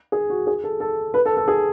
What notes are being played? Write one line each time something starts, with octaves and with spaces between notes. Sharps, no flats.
G#4
F#4
G#4
A4
A4
B4
A4
A4
G#4